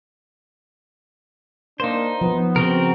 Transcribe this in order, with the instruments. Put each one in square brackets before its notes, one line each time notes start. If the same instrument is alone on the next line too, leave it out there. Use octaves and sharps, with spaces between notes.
[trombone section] A#3 D4 [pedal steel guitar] D#4 C5
[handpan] F3 [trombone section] B3
[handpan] C#3 [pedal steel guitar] C4 F#4 A#4